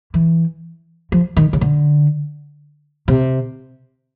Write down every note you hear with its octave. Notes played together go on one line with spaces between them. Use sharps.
E3
F3
D#3
C#3
D3
C3